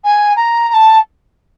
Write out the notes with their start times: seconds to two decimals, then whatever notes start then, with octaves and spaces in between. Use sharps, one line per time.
0.04 G#5
0.36 A#5
0.68 A#5
0.73 A5